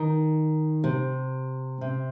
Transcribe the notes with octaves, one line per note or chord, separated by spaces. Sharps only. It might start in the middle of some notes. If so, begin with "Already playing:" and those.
Already playing: D#3
C3
C3